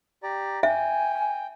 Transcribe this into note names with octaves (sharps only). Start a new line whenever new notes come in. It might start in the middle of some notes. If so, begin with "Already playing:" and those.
G4 D5 A#5
E5 G5 G#5